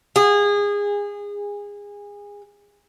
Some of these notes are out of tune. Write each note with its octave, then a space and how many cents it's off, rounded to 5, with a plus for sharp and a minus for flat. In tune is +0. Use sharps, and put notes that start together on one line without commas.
G#4 -25